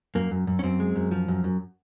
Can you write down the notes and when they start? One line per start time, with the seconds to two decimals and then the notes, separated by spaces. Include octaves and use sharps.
0.15 F#2 A#3
0.31 F#2
0.47 F#2
0.59 C#4
0.63 F#2 C4
0.80 G#3
0.96 F#2
1.11 F3
1.28 F#2
1.44 F#2